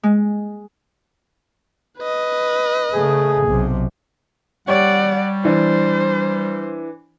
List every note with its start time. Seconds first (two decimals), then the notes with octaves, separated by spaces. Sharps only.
0.03 G#3
1.98 B4 D#5
2.93 C#3 A3 G#4
3.48 B1 C3
4.68 G3 G4 C#5 D5 F#5
5.45 E3 D4 C5